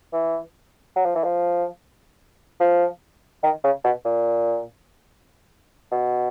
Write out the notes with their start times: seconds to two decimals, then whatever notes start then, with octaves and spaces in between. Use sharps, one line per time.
0.13 E3
0.96 F#3
1.05 F3
1.15 E3
1.24 F3
2.60 F3
3.43 D#3
3.64 C#3
3.84 B2
4.05 A#2
5.92 B2